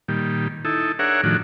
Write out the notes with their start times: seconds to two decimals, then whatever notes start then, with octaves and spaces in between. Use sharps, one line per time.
0.08 A#2 D#3 G3
0.65 D#4 E4 A4
0.99 D4 G#4 A#4 C#5 E5 F#5
1.24 A2 D#3 F3 D4 F#4